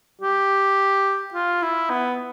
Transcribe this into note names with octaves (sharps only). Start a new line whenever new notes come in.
G4
F4
E4
B3